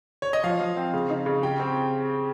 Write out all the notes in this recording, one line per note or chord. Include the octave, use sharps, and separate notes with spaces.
C#5
D#5
F3 F5
F3
C4
C#3
D#4
C#3
G4 G5
C4